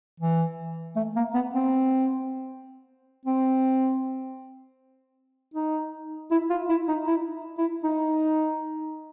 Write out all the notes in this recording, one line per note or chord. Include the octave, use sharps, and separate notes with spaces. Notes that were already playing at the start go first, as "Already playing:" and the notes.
E3
A3
A#3
B3
C4
C4
D#4
E4
F4
E4
D#4
E4
E4
D#4